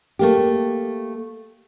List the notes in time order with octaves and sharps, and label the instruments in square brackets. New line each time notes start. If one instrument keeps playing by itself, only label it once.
[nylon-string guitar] A3 A#3 G4